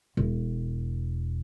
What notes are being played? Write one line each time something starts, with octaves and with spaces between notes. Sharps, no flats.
E1